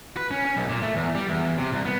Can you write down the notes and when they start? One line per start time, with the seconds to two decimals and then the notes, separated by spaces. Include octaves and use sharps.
0.17 B4
0.31 C#4
0.45 C#4
0.57 B1
0.69 A#2
0.83 A3
0.96 E2
1.15 G3
1.29 E2
1.58 C3
1.72 C2
1.85 B3